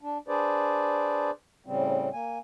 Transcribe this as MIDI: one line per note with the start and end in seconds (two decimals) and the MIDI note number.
0.01 0.18 62
0.28 1.31 62
0.28 1.31 68
0.28 1.31 71
0.28 1.31 72
0.28 1.31 74
1.66 2.09 45
1.66 2.09 49
1.66 2.09 55
1.66 2.09 60
2.13 2.39 58
2.13 2.39 80